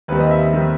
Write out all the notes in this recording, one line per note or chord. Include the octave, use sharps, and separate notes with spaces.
D#2 D#3 G3 C4 B4
D#5
E5
D#3 G3 C4